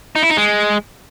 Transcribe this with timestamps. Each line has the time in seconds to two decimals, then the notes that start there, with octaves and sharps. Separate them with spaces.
0.15 D#4
0.23 E4
0.30 D#4
0.37 G#3